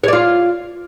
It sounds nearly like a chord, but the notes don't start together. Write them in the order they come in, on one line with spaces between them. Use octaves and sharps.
C#5 D5 F4